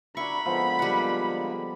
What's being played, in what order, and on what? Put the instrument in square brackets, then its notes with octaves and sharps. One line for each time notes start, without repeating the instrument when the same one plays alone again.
[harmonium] D4 F#4 [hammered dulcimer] E4 A#4 [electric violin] B5 [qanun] C#6
[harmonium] D3 G#3 A#3 [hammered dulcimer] F3 B3 F5
[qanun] G3 F#5